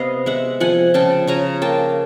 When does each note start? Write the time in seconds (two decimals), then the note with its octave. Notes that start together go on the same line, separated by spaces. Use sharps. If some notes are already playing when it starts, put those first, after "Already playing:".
Already playing: C3 B3 D#5 F5
0.26 G#3 E5 F#5
0.60 F3 F#5 G#5
0.94 C#3 G5 A5
1.27 C#3 G#5 A#5
1.62 A#3 G5 A5